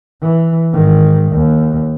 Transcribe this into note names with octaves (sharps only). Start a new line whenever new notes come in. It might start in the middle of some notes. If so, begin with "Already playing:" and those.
E3
G#2 D#3
D#2